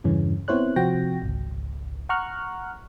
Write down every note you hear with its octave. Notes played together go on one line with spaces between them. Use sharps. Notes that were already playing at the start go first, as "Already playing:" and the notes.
E2 G2 C#3 E3 C#4
B3 C4 E4 C5 C#5 F#6
C3 F3 C4 F#4 G5 A#6
G#1 C#2
F#5 A#5 C#6 F6 F#6